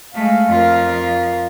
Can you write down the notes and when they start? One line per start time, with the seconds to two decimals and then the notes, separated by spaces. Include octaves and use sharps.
0.14 G#3 A3 F5
0.49 F2 F4 A#4